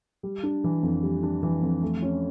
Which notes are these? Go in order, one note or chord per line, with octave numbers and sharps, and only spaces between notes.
G3
D4
E3
F2
G3
D4
E3
F2
A3
C#4